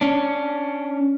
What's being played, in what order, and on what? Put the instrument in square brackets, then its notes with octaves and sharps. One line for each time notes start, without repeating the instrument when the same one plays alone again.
[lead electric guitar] C#4 D4